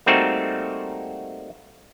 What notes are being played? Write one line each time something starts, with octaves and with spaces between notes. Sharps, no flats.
G3 A3 A#3 C4 D#4 F#4